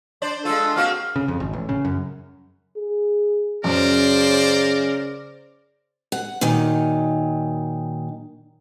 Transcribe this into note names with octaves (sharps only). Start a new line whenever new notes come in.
D4 C5 D5
G#3 D4 F4 A4
A#3 C4 F#4 F5
C#3
F2
G#1
A1
C#3
F#2
G#4
F#2 C#3 A#4 C5 D5
F#5
A#2 D#3 F#3 D#4